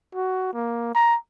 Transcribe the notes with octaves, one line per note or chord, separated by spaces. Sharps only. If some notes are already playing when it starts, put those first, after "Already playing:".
F#4
A#3
A#5